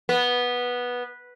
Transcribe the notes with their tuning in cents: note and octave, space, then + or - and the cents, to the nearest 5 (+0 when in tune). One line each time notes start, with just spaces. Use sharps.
B3 -10